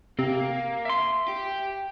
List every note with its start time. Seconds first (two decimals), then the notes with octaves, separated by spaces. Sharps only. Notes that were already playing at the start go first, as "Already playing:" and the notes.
0.19 C3 A#3
0.85 E5 C6
1.28 G4